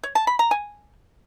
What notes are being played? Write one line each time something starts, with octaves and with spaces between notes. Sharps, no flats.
C#5
A5
B5
A#5
G#5